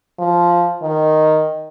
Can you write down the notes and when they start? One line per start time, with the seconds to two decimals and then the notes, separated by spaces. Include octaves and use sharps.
0.19 F3
0.82 D#3